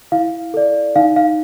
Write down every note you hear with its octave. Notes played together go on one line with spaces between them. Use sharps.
E4 F5
A4 D5
D#4 F5
F5